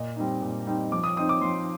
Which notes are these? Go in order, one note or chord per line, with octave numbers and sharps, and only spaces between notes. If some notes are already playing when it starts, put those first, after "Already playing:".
Already playing: A#2 D#5
G3 C4 D#4
A#2
G3 C4 D#4
F3 D6
D#6
C4 D#4 D#6
D6
F3 C6